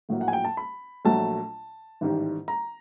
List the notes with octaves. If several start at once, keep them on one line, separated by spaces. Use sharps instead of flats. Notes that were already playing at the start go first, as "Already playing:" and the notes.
A#1 A2 F#3 A#3
F#5
G#5
G5
A5
B5
A#1 A#2 F#3 A3 A5
A1 G#2 D#3 G3
A#5